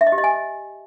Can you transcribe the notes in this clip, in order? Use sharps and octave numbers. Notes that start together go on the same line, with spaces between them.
E5
D#5
G4
D#5
G#5